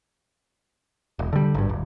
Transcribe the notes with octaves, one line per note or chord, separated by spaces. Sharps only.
E1
D3 G3
G#1 G2
D1